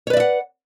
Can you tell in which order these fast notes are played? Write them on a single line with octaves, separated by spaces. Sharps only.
C#5 B4 D5 E5 F#5